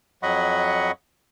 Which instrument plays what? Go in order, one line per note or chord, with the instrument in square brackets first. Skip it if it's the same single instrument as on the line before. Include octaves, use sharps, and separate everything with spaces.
[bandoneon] F2 F#3 D#5 F#5 B5 C#6